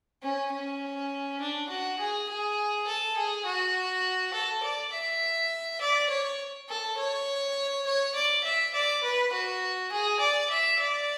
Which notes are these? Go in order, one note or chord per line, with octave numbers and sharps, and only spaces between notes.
C#4
C#4
D4
F#4
G#4
G#4
A4
G#4
F#4
A4
D5
E5
D5
C#5
A4
C#5
C#5
D5
E5
D5
B4
F#4
G#4
D5
E5
D5